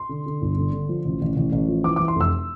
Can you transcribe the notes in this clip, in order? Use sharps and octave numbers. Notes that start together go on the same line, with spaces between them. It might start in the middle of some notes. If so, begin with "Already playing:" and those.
Already playing: C6
D3
D3
G1
D3
D3
F3
A1
A1
A1
A1
F3
E3 D6
D6
E3
C6
F1 E6